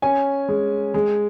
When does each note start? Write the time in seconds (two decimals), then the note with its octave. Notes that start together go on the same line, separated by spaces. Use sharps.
0.02 C#4 G#5
0.49 G#3
0.94 G#3